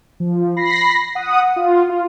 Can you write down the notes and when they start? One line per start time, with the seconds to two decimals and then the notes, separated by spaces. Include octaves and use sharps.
0.20 F3
0.56 B5 A#6 C7
1.15 F#5 D#6
1.56 F4
1.89 F4